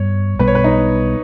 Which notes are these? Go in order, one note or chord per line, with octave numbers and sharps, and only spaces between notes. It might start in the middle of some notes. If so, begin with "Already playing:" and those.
Already playing: G2 G3 B3 C#5
B1 B2 G3 B3 B4
C#5
B4
D#4